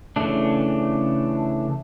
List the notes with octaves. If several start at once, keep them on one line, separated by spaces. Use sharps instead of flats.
C#3 E3 A3 D4